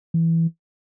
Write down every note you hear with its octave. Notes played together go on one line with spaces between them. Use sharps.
E3